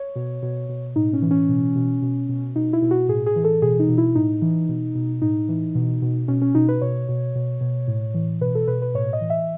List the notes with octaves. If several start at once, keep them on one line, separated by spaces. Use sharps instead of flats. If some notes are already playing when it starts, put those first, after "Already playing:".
Already playing: C#5
B2
B2
B2
A2 D#4
C#4
E3
C#4
B2
B2
B2
B2
B2 D#4
E4
B2
F#4
A2 G#4
G#4
E3
A4
B2 G#4
D#4
B2
E4
A2 D#4
E3
B2
B2
A2 D#4
E3
B2
B2
B2 C#4
C#4
B2 D#4
B4
B2 C#5
B2
B2
B2
A2
E3
B2 B4
A4
B2 B4
B4
A2 C#5
D#5
E3
E5